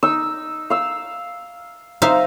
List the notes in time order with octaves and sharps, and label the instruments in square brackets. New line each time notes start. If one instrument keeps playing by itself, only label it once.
[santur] D#4 E6
F5 E6
[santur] D#4 A#5 [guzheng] C5 E5 F5